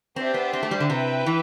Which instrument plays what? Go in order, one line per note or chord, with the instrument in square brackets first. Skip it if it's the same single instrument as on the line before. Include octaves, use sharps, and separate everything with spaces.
[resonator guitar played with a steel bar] C4 [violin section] D4 G4 C5 E5
[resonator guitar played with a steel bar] B3
C4
A3
G3
D3
[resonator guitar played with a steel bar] C3 [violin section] E4 B4 E5 G5
[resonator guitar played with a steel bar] E3